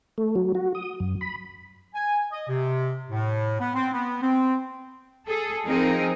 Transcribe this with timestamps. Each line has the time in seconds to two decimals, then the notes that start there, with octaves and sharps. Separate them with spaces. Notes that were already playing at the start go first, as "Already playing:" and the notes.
0.18 A3
0.36 F#3
0.55 F#4
0.75 D#6
1.00 F#2
1.21 B5
1.94 G#5
2.31 D#5
2.48 C3
3.09 A2
3.59 B3
3.74 C4
3.92 B3
4.22 C4
5.27 G#4 A4
5.64 F3 C4 D#4 G#4 A#4